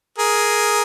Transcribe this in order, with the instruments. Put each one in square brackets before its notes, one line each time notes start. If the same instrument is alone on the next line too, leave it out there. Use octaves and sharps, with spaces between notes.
[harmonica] G#4 A#4